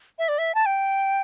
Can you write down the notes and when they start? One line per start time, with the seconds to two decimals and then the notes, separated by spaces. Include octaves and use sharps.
0.19 E5
0.28 D5
0.38 E5
0.55 A5
0.66 G5